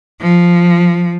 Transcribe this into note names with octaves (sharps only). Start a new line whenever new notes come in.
F3